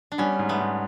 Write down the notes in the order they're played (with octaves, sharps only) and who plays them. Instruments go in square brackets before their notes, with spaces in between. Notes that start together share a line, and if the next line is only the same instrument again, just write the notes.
[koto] D4
[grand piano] G3 [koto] B3 C#4
[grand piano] G#2
[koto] A3 B3
[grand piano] G#2